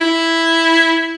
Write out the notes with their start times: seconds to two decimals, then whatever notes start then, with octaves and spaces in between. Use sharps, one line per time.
0.01 E4